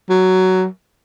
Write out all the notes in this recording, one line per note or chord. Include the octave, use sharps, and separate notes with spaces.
F#3